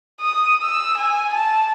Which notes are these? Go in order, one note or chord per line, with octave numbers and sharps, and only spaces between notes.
D#6
E6
G#5
A5